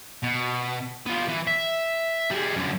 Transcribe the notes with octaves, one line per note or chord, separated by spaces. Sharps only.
B2
B3 F4
E3
E5
G3 G#4
F#2 D3